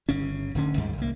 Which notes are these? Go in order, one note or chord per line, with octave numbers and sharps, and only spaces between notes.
G1 C#3 C#4
D1 D3 C#4
G#1 D#2 G#2 G3
C2 A#3